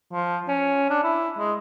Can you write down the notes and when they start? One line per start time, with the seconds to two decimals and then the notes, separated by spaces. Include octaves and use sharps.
0.12 F3
0.48 C#4
0.90 D4
1.04 E4
1.38 G#3